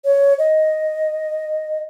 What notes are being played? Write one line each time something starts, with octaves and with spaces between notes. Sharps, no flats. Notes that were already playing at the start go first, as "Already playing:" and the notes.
C#5
D#5